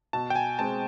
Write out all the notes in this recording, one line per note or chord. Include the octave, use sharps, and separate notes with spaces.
B2 A5
G5
G#5
G#3 C4 A5